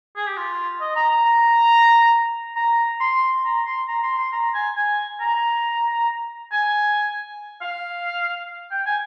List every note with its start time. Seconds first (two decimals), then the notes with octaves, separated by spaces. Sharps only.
0.16 G#4
0.27 G4
0.37 F4
0.80 D#5
0.96 A#5
1.11 A#5
1.25 A#5
2.56 A#5
3.00 C6
3.45 A#5
3.66 C6
3.88 A#5
4.03 C6
4.18 C6
4.32 A#5
4.54 G#5
4.75 G#5
5.20 A#5
6.52 G#5
7.61 F5
8.71 G5
8.86 G#5